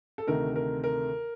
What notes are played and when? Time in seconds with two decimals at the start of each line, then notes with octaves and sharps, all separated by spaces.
0.18 A4
0.27 D2 C3 D#3 A3 A#4
0.56 A#4
0.84 A#4